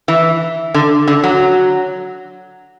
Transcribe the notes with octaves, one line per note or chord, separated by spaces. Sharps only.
E3
D3
D3
F#3